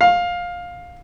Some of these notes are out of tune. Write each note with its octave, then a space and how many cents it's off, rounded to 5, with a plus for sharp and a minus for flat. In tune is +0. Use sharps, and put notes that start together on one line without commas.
F5 +15